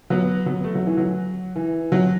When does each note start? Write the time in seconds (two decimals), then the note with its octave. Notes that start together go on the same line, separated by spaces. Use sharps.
0.10 F#3 B3
0.46 F#3 B3
0.64 A3
0.75 F#3
0.86 E3
0.97 F#3
1.56 E3
1.92 F#3